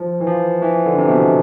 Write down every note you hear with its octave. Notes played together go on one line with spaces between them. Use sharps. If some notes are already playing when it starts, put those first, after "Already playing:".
Already playing: F3
E3
F3
E3
D3
C3
B2